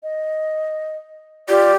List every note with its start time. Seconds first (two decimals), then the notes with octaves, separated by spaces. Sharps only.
0.03 D#5
1.49 F4 G4 D5